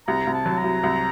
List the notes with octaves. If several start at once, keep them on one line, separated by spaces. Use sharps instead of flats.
C2 A#5
C2
A5
F#3
A#5
C2
C2